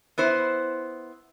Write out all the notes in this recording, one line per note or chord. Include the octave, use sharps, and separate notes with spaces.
B3 E4 C5